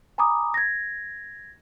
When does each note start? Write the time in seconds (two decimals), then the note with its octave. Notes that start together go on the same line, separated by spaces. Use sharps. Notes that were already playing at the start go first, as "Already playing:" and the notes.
0.18 G#5 A#5 B5 D6 D#6
0.54 G#6 A#6